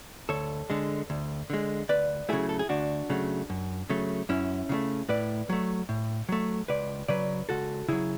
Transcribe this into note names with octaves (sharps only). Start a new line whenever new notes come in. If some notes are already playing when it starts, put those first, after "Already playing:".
D2 A4 C#5
D3 G#3
D2
D3 G#3
D2 B4 D5
C#3 F#3 A3 E4 G#4
A4
G#4
D2 D4 F#4
C#3 F#3 A3
F#2
C#3 F#3 A3
F#2 C#4 E4
C#3 F#3 A3
A2 B4 D5
F#3 A3
A2
F#3 A3
C#2 B4 D5
C#3 F#3 B4 D5
C#2 F#4 A4
C#3 F#3 E4 G#4